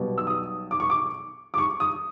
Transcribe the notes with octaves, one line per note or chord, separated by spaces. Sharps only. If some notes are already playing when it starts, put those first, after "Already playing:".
Already playing: B1 B2 G3
E6
D#6
D6
C#6
D6
D6
C#6
D#6